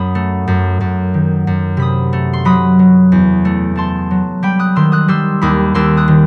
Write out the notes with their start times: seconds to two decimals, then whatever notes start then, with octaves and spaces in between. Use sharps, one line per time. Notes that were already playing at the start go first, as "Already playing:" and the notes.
Already playing: F#2 B5 D#6
0.15 A3
0.48 F#2
0.81 F#2
1.14 D#3
1.47 F#2
1.77 C3 B5 D#6
2.13 A3
2.33 C6
2.45 F#3 B5 D#6
2.79 F#3
3.12 E2
3.45 A3
3.75 A3 A5 C6
4.11 F#3
4.43 G3 G5 B5
4.59 D#6 F#6
4.76 D#3 C6 E6
4.92 D#6 F#6
5.08 G3 C6 E6
5.41 D#2 B5 D#6
5.74 D#2 C6 E6
5.97 D#6 F#6
6.08 D#3